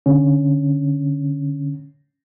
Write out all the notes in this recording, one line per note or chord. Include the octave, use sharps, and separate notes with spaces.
D3 C#4